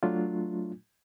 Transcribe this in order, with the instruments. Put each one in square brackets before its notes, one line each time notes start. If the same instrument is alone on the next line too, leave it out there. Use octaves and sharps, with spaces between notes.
[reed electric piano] F#3 A3 D4 F4